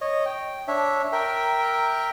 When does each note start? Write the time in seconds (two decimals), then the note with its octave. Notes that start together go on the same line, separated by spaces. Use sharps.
0.01 C#5 D#5
0.26 G5
0.68 D4 C#5 E5
1.12 A#4 E5 G5